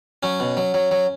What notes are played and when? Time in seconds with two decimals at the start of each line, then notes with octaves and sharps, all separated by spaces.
0.23 F#3 C#4
0.40 B2
0.57 F#3
0.74 F#3
0.91 F#3